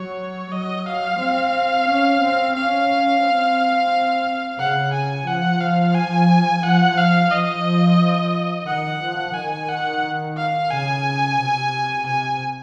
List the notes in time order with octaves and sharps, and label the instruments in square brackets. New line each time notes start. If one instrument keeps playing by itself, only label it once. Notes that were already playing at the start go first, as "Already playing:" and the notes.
Already playing: [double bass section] F#3 [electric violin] C#5
[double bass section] F#3 [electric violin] D#5
[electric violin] F5
[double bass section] C4
C#4
C4
[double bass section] C#4 [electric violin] F5
[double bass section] C4
[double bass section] C#3 [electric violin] F#5
[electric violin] G#5
[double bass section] F3 [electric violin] F#5
[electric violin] F5
G#5
[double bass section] F3 [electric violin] F#5
[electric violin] F5
[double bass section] F3 [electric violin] D#5
[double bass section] D#3 [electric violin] F#5
[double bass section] F3
[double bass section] D#3 [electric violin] G#5
[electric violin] F#5
F5
[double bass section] C#3 [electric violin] G#5
[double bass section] C3
[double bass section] C3 [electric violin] G#5